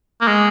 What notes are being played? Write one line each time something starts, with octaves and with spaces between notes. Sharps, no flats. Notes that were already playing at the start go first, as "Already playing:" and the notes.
A#3
G#3